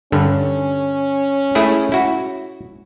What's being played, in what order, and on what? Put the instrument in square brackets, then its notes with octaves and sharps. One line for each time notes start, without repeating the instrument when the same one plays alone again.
[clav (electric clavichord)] G2 D3 [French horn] C#4
[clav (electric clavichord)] A3 E4 G#4
E4 F#4